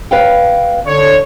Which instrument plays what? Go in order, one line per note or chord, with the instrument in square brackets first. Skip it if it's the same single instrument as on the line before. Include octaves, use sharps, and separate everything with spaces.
[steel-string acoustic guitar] B4 F5 G5
[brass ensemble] D3 C#5